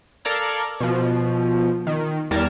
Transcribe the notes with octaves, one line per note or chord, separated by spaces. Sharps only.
A4 A#4 D5 F5 A#5 G#6
B2 F3
D#3
E2 G3 A#4 A5 G#6 A#6